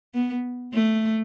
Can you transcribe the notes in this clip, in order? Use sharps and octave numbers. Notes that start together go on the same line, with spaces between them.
B3
A3